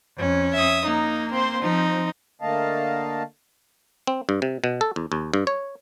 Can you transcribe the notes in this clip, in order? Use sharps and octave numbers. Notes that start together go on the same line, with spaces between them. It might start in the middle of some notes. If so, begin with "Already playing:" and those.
F2 C#4
E5 D#6
A#3 D#4
C4 C5
F3 C4 D#4
D3 A3 A#3 D#5 F5 A5
C4
G2
C3
B2
A4
E2
D#2
G2
C#5